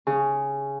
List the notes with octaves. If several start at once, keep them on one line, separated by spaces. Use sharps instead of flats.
C#3